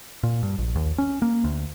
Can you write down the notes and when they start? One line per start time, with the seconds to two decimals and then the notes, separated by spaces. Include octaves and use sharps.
0.23 A#2
0.43 G2
0.58 A#1
0.76 D#2
0.98 C#4
1.22 A#3
1.44 D2